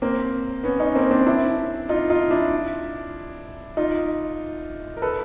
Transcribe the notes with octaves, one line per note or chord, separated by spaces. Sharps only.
A#3 C4
B3 C#4
C#4 D#4
A#3 C4
C4 D4
D4 E4
D#4 F4
D#4 F4
D4 E4
D#4 F4
A#4
A4 B4